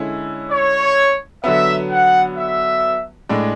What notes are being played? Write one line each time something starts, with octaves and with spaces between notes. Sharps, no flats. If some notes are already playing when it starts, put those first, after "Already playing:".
Already playing: D3 G#3 C#4 E4
C#5
D3 F#3 B3 E5
F#5
E5
A2 G#3 D4